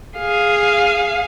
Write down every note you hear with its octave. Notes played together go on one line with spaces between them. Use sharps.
G#4 F5